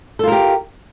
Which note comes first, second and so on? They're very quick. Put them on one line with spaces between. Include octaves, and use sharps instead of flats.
A4 F4 A#4 G4